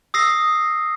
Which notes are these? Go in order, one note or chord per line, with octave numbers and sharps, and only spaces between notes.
D#6 E6 A#6 C7